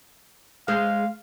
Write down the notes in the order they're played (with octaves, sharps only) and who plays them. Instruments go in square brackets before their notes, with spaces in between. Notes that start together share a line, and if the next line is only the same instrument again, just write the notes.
[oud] G#3 G#4 C5 [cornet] F5